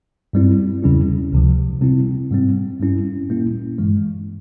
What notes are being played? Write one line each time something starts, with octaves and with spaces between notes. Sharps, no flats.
G2 G3 C4 E4
E2 C#3 G3 C#4 E4
C#2 C3 F3
C3 G3 C4 E4
G#2 G3 C4
G2 G3 C#4 E4
A#2 G3 A#3 C#4 E4
G2 E3 G#3